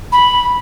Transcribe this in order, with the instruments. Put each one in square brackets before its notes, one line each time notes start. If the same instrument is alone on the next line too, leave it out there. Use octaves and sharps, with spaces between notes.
[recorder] B5